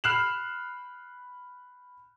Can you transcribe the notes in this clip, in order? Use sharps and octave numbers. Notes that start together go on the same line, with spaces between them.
B5 F6 F#6 C7 E7 F#7